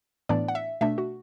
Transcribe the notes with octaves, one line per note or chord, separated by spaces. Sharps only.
A2 E3 B3 D4 D5
F#5
E5
B2 A3 D4 E5
F#4